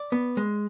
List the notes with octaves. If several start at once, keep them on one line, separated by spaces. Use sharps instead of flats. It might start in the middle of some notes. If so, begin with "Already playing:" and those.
Already playing: D5
B3
G#3